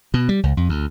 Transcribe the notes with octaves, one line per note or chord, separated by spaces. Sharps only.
B2
G3
C#2
F2
D2